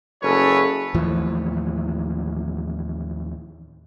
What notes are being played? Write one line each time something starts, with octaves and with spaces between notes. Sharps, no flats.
F#1 G#4 A4 B4 C#5
D#2 A2 E3 F3